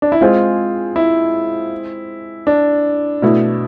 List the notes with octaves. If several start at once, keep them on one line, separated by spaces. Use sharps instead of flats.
D4
E4
G#3 C4 F4 G#4 C5
E4
D4
B2 A3 E4